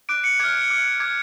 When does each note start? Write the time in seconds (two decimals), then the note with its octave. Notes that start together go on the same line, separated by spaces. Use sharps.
0.09 D6 F#6 D7
0.24 C#7
0.40 D6 F6 G#6
0.70 D6 F6
1.00 D6 F#6 G#6